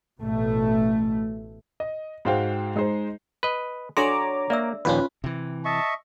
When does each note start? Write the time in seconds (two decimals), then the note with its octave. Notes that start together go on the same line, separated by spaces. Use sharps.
0.21 A1 B2 A3
1.80 D#5
2.25 G#2 G#3 F#4 C5 F5 G5
2.76 G#3 D#4 G#4 C5
3.43 B4 D#5
3.97 D4 F#4 A4 C#5 D5 A#5 C6 D6
4.50 A#3 D5 E5 E6
4.85 A#1 D#2 C#4 F4 B4
5.24 C3 E3
5.65 D#5 E5 A5 C#6